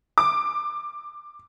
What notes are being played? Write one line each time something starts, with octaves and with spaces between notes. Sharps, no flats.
D6